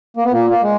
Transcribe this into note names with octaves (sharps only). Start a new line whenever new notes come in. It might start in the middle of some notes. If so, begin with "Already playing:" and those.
A#3
B3
A#2 A#3
A#3
G#3